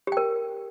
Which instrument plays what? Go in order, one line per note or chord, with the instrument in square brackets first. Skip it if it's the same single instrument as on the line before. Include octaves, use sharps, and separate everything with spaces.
[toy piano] G4
G5
A#4